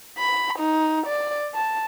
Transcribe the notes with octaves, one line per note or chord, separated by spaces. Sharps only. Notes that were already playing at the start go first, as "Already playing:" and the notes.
B5
D#4
D5
A5